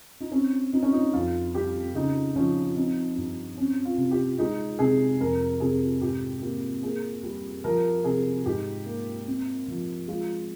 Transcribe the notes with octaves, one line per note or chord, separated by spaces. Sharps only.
D#4
C4 C#4
C4 D#4
C#4
D#4
F2 F4
G3 G4
C#3 D#4
F3 C#4
C4 D#4
G2 D#4
C4 C#4
F4
C3
G4
G#3 D#4
C3 G#4
F2 A#4
C3 G#4
G#2 G4
A#3 G4
A#3 G#4
G3
F3 A#4
C3 G#4
G#2 G4
A#3
C4
F3
G#3 F4